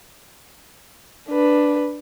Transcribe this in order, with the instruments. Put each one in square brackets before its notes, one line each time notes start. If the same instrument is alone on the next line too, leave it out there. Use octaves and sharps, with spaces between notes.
[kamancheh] D4 B4